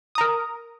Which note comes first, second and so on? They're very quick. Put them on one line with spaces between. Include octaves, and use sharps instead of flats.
D#6 A#5 A#4